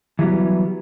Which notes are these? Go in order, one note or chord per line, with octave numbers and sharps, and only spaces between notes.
E3 F#3 G3 B3